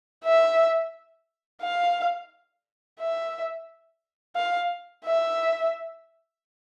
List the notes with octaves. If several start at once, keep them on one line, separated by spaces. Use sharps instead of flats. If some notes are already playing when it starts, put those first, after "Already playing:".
E5
F5
E5
F5
E5